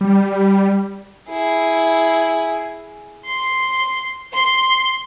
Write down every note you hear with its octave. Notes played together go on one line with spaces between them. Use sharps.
G3
E4 G#4
C6
C6